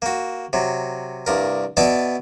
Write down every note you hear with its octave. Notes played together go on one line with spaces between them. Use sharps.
A#3 F#4
C3 F#3
C2 G2 A#4
B2 B3 E4 D5 A5